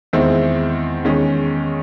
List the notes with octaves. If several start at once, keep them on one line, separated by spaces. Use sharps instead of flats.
E2 D#3 G#3 C4 E4
E2 D#3 G#3 C#4